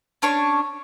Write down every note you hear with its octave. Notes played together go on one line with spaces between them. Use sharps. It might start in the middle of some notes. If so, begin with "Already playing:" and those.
C#4 D4 C#5 C#6